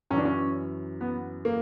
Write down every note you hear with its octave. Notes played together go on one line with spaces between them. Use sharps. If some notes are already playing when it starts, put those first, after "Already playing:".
F#2 E3 C#4 D4
C#4
B3
A#3